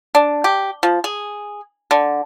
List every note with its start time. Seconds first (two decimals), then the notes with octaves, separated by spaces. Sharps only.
0.15 D4
0.44 G4
0.83 F3
1.04 G#4
1.91 D3